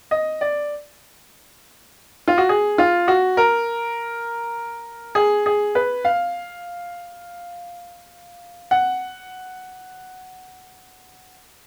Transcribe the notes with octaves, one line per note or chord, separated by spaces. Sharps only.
D#5
D5
F4
F#4
G#4
F4
F#4
A#4
G#4
G#4
B4
F5
F#5